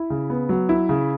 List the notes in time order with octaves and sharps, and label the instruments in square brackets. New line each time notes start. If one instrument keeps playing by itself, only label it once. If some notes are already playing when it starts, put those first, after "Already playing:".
Already playing: [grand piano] E4
C#3
B3
F#3
E4
C#3